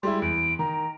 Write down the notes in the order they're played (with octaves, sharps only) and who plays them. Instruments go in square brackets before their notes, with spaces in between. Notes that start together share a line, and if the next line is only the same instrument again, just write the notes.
[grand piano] G3 G#3 E4 [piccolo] C6
[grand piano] E2 [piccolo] D7
[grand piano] D#3 [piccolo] A#5